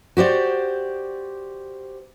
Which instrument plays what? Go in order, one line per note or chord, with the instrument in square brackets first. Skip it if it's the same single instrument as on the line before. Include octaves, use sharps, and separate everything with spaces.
[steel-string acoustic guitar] F#4 G4 C5 D5